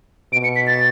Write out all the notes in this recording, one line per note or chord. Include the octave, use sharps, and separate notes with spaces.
B2 D7
C#7
B6
A6